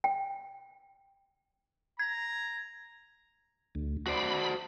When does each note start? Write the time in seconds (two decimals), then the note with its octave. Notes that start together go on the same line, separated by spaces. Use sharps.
0.04 G5
1.99 A#5 G#6
3.75 D2
4.06 F#4 C5 D5 B5